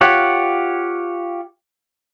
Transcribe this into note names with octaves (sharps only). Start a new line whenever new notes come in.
F4 G4 C#5 F#5